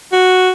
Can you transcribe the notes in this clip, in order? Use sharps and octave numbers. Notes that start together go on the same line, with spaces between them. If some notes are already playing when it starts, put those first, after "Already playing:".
F#4